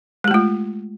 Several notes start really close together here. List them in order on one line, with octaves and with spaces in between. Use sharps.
G#3 G4 A3 F4